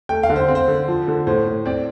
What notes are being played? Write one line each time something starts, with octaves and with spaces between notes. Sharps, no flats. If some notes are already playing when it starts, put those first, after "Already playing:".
A3 G5
F5
D3
C5
C4
C5
D3
F3
D3
A2 C5
A2
C4 D5